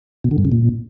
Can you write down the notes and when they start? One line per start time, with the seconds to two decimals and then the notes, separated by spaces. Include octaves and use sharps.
0.24 B2
0.31 D3
0.38 G2
0.45 C#3
0.52 A#2